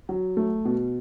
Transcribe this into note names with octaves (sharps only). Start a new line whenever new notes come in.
F#3
A3
B2